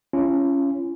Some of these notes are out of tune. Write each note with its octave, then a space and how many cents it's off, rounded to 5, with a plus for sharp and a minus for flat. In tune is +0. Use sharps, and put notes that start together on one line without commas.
C#4 +0 F4 -45